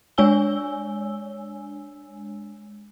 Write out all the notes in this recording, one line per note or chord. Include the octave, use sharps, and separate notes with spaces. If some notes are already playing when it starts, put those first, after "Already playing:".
G#3 D4 C#5 G#5 E6 G7